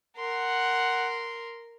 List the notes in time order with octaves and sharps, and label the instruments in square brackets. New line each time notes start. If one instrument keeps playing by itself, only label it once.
[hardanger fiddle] A#4 C6 [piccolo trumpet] F#5